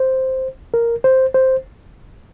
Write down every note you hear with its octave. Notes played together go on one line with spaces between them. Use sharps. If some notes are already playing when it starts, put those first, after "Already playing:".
Already playing: C5
A#4
C5
C5